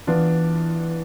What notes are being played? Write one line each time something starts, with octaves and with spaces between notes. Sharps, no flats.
E3 B3 D4 F4